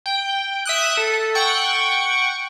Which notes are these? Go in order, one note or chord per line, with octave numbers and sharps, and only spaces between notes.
G5
E5 D#6 F#6
A4
F#5 G5 C#6